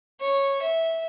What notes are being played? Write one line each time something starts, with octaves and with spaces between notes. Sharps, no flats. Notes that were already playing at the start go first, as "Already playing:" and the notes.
C#5
E5